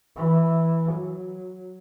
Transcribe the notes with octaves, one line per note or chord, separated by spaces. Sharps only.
E3
F#3